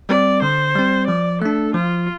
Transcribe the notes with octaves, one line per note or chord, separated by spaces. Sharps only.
G3 C4 D5
D3 C5
G3 C4
F3 D5
A3 D4 A4
F3 F4